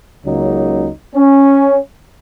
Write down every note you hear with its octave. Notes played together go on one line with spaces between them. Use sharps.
C#2 C#3 F#3 A#3 D#4
C#4